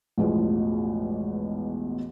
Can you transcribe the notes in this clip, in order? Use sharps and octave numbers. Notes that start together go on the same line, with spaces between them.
A1 E2 G#2 B2 F3